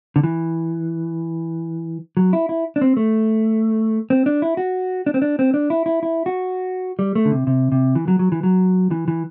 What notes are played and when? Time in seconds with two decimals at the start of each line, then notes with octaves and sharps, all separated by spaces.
0.16 D3
0.23 E3
2.17 F#3
2.33 E4
2.49 E4
2.76 D4
2.81 C4
2.97 A3
4.10 C4
4.26 D4
4.42 E4
4.57 F#4
5.06 D4
5.14 C4
5.22 D4
5.39 C4
5.54 D4
5.70 E4
5.86 E4
6.03 E4
6.26 F#4
6.99 G3
7.15 A3
7.25 D3
7.32 C3
7.47 C3
7.72 C3
7.95 E3
8.08 F#3
8.19 F#3
8.32 E3
8.43 F#3
8.91 E3
9.08 E3